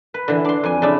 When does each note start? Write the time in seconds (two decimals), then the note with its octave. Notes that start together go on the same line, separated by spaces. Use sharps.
0.14 B4
0.28 D3 E3
0.45 D4 C6
0.63 F2 G#5
0.82 C#3 D4 E4